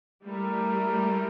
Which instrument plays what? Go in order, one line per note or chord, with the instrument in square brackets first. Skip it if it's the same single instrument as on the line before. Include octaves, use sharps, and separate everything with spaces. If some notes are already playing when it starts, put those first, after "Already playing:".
[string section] G3 A3 [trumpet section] E4 G4 A#4